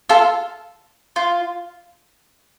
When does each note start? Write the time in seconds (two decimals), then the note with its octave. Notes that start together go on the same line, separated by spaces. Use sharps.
0.09 F4 A4
1.16 F4